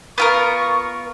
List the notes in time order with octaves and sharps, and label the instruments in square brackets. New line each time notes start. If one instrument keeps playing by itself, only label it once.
[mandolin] B3 F4 A#4 [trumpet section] F5 C#6